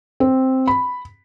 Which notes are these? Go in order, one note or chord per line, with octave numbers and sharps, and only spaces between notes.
C4
B5